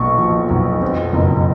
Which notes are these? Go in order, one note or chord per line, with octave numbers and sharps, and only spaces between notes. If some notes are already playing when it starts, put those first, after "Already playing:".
Already playing: B1 A#2 C#6
F3
B1
F2
F#1